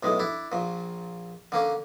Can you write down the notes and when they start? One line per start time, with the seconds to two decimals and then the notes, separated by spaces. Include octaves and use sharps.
0.03 B1 A2 G#3
0.20 D4 E4
0.52 A#1 A#2
1.52 D3 A#3 C#4